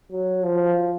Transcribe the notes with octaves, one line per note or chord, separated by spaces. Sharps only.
F#3
F3